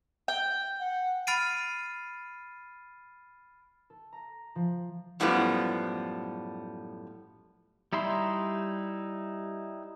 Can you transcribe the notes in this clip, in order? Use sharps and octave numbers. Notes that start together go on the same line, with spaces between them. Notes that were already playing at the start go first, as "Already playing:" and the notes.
G5
F#5
B5 F6 A6 C7 D7 D#7
A4
A#5
F3
F#2 A2 F3 G3 B3
G3 D#4 E4 E5 C6